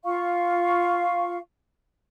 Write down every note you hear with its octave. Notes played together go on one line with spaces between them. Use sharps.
F4 F5 C#6